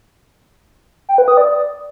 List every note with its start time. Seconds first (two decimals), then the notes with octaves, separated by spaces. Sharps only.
1.09 G5
1.18 B4
1.28 D#6
1.37 D5